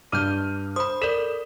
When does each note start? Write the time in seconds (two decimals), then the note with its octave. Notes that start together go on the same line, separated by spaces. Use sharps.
0.12 G2 D6 F6 G6 D#7
0.76 C5 B5 D#6
1.02 A4 A#4 D5 E7